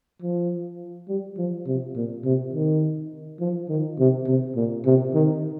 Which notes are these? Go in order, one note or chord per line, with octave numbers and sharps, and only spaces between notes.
F3
G3
F3
C3
A#2
C3
D#3
F3
D#3
C3
C3
A#2
C3
D#3